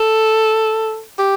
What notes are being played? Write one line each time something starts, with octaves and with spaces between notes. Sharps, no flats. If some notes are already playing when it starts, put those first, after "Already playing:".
Already playing: A4
G4